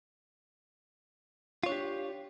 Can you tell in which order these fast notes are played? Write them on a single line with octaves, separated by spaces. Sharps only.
F4 C#5 D4 G4